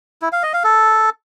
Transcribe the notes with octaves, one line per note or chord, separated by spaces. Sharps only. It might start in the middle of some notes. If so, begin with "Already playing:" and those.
E4
F5
D#5
F5
A4